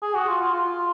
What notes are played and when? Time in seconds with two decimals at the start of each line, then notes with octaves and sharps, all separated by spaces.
0.02 G#4
0.14 F#4
0.28 F4
0.41 F4
0.54 F4